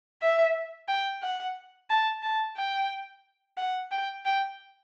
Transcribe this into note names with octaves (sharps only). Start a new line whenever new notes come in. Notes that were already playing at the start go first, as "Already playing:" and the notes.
E5
G5
F#5
A5
A5
G5
F#5
G5
G5